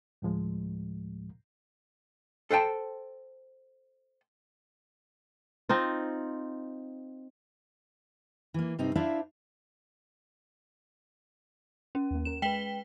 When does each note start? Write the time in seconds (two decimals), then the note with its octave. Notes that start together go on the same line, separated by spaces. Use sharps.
0.22 D2 A2 F3 G#3
2.51 A4 C5 F#5 G5 A5
5.69 C4 D#4 F4
8.54 E3 A#3
8.78 G2 C3 C4 D#4
8.95 D4 E4 C5 D5 E5 F5
11.95 C#4
12.11 D#2 A#3
12.25 C#4 A#4 E7
12.42 G#3 B4 G5 B6 G7